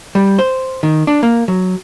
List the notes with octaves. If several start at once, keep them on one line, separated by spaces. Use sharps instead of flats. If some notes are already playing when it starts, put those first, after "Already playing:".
G3
C5
D#3
D4
A#3
F#3